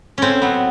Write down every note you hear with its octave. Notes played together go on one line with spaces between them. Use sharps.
A2 C4 C#4
F#3 B3